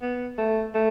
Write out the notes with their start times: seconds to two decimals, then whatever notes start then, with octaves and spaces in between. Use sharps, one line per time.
0.02 B3
0.38 A3
0.74 A3